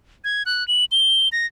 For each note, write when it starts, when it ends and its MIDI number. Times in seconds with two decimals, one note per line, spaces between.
0.24 0.43 92
0.46 0.66 90
0.68 0.85 102
0.92 1.29 103
1.32 1.46 94